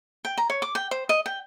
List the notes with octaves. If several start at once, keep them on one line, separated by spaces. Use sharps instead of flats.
G5
A#5
C#5
D6
G5
C5
D#5
G5